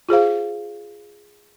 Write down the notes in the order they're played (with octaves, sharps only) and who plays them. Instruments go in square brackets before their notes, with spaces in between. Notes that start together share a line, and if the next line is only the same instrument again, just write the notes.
[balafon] F4 G#4 C5 F5